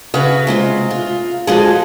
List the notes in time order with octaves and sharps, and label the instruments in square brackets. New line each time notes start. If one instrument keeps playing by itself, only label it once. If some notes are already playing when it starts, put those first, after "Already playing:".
[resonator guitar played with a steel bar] C#3 F#4 [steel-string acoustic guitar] B4 E5
[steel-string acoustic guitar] C3 G#3 F4
F4
[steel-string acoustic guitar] F3 G#3 F#4 [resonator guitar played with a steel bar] G#4 A4